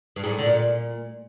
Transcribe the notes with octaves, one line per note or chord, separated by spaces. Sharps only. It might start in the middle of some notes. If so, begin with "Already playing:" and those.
G2
G#2
A2
D3
A#2